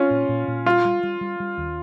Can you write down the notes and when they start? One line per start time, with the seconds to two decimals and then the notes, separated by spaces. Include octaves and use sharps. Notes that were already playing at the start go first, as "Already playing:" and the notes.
Already playing: C4 C#4 F4
0.10 A#2
0.29 A#2
0.48 A#2
0.66 G3 F4
0.85 G3
1.03 G3
1.21 G3
1.40 G3
1.58 D#2